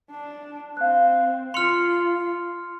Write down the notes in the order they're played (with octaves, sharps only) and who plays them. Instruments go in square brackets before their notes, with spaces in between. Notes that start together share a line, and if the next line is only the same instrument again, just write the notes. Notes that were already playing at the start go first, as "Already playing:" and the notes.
[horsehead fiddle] D4
[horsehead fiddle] C4 [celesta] F5 F#6
[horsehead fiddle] F4 [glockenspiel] C6 F6 [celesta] C#7 F7